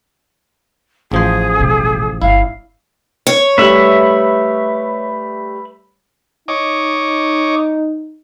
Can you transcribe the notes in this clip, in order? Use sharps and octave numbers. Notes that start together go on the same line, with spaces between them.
A1 F3 G#4 C5
D#1 B2
G1 E4 F5
C#5
G3 A3 B4 E5 B5
D#4 C#5 D#5 D6